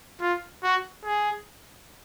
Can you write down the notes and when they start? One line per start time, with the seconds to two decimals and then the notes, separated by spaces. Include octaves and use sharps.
0.21 F4
0.63 F#4
1.05 G#4